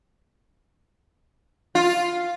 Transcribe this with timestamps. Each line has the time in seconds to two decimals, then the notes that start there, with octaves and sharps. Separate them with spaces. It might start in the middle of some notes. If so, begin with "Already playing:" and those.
1.75 F4